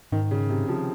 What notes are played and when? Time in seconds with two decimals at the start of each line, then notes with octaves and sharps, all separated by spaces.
0.12 G#2 D#3
0.31 C#3
0.49 C3
0.68 F3